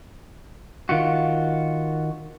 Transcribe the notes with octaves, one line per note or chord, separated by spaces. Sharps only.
D#3 F4 F#4